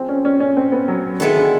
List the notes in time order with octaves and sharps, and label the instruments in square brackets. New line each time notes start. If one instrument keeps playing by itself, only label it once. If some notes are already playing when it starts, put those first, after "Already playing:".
Already playing: [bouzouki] F3 G#4 [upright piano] C4
[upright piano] C#4
C#4
C#4
C4
B3
F#3
[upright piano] D#3 [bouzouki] G#3 B3 E4 A4
[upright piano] D3